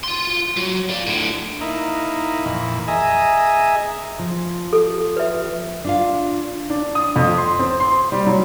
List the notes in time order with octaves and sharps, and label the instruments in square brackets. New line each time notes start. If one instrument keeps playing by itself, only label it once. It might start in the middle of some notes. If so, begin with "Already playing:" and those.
[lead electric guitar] F4 C6
F#3
F4 D5
A2 D3
[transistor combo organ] A#3 D#4 E4
F2 A#2 E3
G#4 D#5 E5 G#5 A#5
[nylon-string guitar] F3
[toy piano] A4
B4 E5
[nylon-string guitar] D4 F4 F5
[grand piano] D4
D#6
F2
C6
C4
C6
G3
F#3